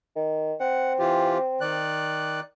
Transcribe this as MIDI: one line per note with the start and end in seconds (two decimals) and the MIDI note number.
0.16 0.54 51
0.60 1.84 60
0.60 0.93 78
0.99 1.38 52
0.99 1.38 65
0.99 1.38 67
1.61 2.40 51
1.61 2.40 74
1.61 2.40 90